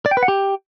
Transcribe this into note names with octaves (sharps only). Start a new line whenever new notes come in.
D5
G5
B4
F#5
G4